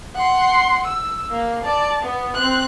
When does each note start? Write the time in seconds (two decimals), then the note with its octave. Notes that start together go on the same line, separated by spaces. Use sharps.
0.15 F#5 C6
0.84 E6
1.31 A#3
1.64 D5 A5
2.03 B3
2.35 C4 F#6